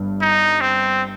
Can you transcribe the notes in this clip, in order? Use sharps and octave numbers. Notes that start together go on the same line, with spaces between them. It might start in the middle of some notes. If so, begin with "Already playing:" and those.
Already playing: G1 G2
D#4
C4